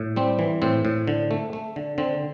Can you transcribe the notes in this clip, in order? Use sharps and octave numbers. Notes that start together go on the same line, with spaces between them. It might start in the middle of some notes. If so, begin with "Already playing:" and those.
Already playing: A2
G3 C4
E3
A2 C4
A2
D3
A3
A3
D3
D3 C4